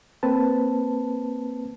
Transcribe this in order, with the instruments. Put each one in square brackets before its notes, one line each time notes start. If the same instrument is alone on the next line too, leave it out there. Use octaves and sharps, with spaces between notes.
[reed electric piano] A#3 C4 B4 A5